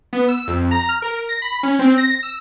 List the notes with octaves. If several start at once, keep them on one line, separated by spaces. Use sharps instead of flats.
B3
E6
F2
A#5
F6
A#4
A#6
B5
C#4
C4
A#6
E6